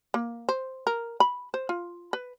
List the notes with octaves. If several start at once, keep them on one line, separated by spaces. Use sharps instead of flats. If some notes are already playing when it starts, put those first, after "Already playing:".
A#3
C5
A#4
B5
C5
F4
B4